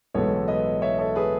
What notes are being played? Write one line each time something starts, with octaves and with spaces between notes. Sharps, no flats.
B1 A2 E3 G#3 B3 A4 C#5
B4 D#5
C#5 E5
A4 C#5
G#4 B4